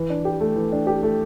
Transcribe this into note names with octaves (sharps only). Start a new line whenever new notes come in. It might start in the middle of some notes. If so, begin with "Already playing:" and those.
Already playing: E3
D4
G4
A3
E3
D4
G4
A3